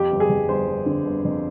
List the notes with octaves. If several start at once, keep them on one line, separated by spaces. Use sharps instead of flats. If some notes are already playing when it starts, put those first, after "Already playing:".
Already playing: F2 G4
G1
G#4
F2
G1 C5
G1
D3
G1
F2